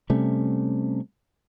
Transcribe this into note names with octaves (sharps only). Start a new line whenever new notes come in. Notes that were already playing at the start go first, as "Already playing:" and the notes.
C3 G3 A3 C#4